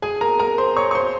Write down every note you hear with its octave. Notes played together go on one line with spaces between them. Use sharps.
G#4 G#5
A#4 A#5
A#4 A#5
C5 C6
C#5 C#6
C#6
C5 C6